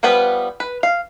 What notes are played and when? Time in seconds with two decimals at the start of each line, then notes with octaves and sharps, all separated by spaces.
0.03 F3 G3 B3 B4 B5
0.60 B4
0.83 F5